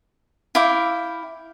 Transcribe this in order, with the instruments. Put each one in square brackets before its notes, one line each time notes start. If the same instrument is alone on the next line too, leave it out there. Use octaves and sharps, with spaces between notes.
[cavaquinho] E4 F5 G5 D6